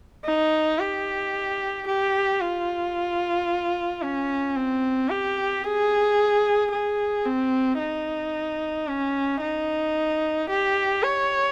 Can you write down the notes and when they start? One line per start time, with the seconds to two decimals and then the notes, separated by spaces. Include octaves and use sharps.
0.25 D#4
0.79 G4
1.87 G4
2.41 F4
4.02 C#4
4.56 C4
5.10 G4
5.64 G#4
6.72 G#4
7.26 C4
7.79 D#4
8.88 C#4
9.41 D#4
10.50 G4
11.03 C#5